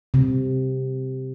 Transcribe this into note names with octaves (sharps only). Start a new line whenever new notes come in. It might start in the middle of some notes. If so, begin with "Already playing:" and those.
C3